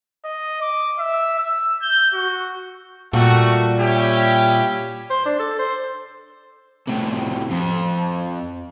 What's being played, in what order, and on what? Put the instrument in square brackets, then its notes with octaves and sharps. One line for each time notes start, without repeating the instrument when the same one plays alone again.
[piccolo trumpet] D#5
D6
E5
E6
G6
F#4
[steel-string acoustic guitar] A#2 G3 [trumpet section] A3 F#4
[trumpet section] C#4 E4 G4
[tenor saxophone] C5
D4
A4
C5
[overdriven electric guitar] A2 C3
F2